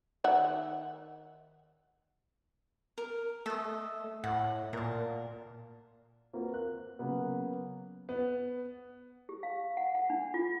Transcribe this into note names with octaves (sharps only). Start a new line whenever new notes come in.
D#3 E5 F#5
A#4
A3 A4 D#5
A2 F#5
A#2 A#4 A5
A#3 C4 F4 F#4 A#4 B4
F#6
C#3 F#3 A#3 B3
B3
G4
F5
F#5
F#5
D4
F4